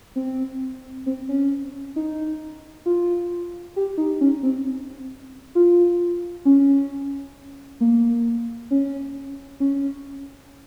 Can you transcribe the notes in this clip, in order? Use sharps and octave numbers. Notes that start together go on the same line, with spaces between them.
C4
C4
C#4
D#4
F4
G4
D#4
C#4
C4
F4
C#4
A#3
C#4
C#4